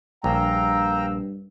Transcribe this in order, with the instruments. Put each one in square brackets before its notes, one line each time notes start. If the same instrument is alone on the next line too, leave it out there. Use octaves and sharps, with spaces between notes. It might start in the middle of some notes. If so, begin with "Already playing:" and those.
[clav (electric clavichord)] A#1 [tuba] G2 [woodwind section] F5 E6 [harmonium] G5 A#5